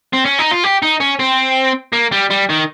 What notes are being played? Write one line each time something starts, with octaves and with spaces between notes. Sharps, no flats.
C4
C#4
D#4
F4
G4
D#4
C#4
C4
A#3
G3
G3
D#3